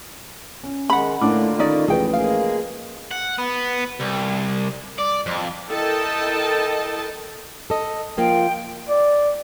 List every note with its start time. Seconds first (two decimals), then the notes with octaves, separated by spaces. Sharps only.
0.64 C#4
0.90 D#3 G#3 F#5 B5
1.22 A2 D3 A#3 D4 F4 D6
1.59 D#3 C#4 D#4 D5 D#5
1.88 A1 F3 G#4 B4 G5
2.13 G#3 A#3 G#4 F5
3.11 F#5
3.39 B3
4.00 C2
4.98 D5
5.26 F2
5.69 E4 A4 A#4 D#5 G5 A5
7.70 A4 D#5
8.18 F3 A#3 F4 G5
8.89 D5